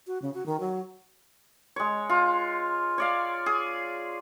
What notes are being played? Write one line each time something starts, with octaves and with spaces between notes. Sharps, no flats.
F#4
C#3
F#4
D#3
F#3
G#3 C#5
F4
C#5 D5 F5
G#4